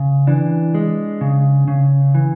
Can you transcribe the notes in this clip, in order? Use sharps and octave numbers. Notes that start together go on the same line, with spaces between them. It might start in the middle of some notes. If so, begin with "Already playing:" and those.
Already playing: C#3
E3 D4
G#3
C#3
C#3
E3